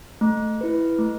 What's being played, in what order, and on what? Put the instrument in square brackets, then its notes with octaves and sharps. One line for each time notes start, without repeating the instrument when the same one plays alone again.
[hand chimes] A3
E4 B4
A3